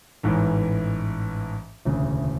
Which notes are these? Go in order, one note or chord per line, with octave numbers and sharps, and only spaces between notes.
A1 G#2 E3
E1 D2 C#3